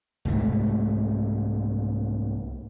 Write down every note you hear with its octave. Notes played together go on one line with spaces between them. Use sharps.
C2 G#2 A3